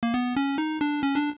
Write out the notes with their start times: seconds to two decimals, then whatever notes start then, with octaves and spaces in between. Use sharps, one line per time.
0.03 A#3
0.14 B3
0.36 C#4
0.58 D#4
0.81 D4
1.03 C#4
1.16 D4